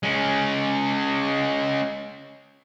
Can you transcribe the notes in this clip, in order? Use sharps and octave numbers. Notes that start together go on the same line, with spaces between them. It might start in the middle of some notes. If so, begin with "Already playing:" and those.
G#3 C#4